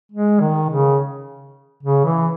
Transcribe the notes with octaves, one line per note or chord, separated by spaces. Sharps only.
G#3
D#3
C#3
C#3
E3